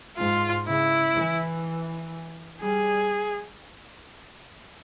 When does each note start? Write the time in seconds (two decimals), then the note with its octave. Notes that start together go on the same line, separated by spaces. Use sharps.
0.17 G#2 F4
0.67 C#3 E4
1.15 E3
2.61 G3 G#4